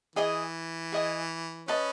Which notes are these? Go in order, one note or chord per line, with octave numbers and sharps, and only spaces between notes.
E3 G#4 D#5 G#5
G#4 D#5 G#5
C#4 B4 D#5 A5